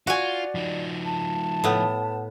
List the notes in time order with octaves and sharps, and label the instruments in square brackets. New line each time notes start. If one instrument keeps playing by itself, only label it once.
[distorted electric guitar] F4 [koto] F#4 G#5 [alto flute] D5
[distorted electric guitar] F3 D#4
[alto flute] A5
[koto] A2 B3